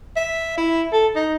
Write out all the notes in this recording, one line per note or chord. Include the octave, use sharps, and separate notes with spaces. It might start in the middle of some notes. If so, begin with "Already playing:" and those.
E5
E4
A4
D#4